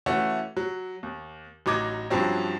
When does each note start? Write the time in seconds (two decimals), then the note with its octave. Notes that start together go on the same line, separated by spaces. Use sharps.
0.06 E3 A3 C#4 F#4
0.57 F#3
1.03 D#2
1.66 A1 F#3 D#4 D6 G#6
2.10 G2 F3 F#3 C4 C#4